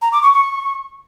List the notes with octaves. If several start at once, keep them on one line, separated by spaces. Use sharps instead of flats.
A#5
D6
C#6
C#6